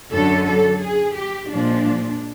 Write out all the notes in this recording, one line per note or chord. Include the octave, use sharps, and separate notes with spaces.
F#2 D3 F#3 A4
A4
G#4
G4
A#2 F3 G#3 D4